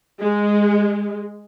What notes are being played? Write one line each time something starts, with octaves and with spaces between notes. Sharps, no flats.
G#3